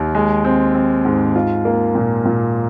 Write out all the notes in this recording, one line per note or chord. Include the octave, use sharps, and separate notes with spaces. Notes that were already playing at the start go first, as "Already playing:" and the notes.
Already playing: D#2 D#3
G#3
C4
C4
G#2
F4
A#3
A#2
A#2